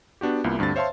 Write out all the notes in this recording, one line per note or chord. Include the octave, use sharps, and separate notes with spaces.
B3 D4 F#4 G4
C2 A#3 B3 E4 F4
D2 G2 D3 C4 A6
C5 C#5 E5 F5 A5 C6